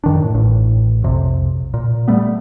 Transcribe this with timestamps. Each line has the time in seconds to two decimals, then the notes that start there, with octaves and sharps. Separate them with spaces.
0.04 F#2 D#3 D4
0.22 A2
0.34 A1 A2
1.04 B1 F2 C3
1.74 A#2
2.08 G3 A3 B3